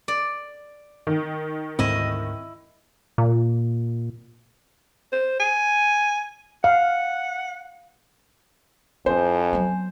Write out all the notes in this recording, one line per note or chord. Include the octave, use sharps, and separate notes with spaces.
D5
D#3
D2 G#2 C4 E4 D#5
A#2
C5
G#5
F5 F#5
F2 E4 C5 G#5
F#3 B3